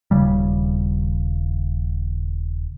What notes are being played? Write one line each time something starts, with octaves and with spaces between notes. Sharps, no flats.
D#1 C#3 G3